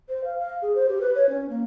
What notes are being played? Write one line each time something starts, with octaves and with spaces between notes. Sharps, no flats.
C5
F5
F5
G#4
C5
G4
B4
C#5
C#4
A#3